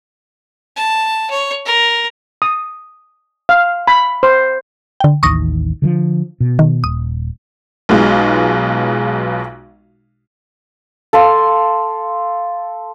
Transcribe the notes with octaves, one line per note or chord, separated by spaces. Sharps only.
A5
C#5
A#4
D#6
F5
B5
C5
D3 G5
A1 D#2 E3 C#6 D#6 A#6
D3 D#3 F3
B2
D#3
D#1 D#6
B1 B2 G#3 F4
A4 F5 C6 D6